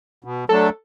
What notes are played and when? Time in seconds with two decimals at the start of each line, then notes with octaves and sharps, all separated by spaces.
0.24 B2
0.49 F#3 A3 D4 A4